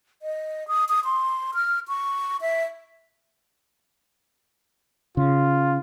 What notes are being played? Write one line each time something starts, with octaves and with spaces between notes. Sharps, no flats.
D#5
D#6
D#6
C6
F6
C#6
E5
C#3 F4